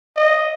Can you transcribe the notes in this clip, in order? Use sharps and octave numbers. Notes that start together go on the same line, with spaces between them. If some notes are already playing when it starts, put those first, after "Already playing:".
D#5